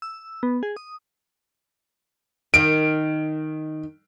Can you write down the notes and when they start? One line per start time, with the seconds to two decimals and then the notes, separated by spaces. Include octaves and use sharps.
0.02 E6
0.43 B3
0.63 G#4
0.76 D#6
2.54 D#3 D7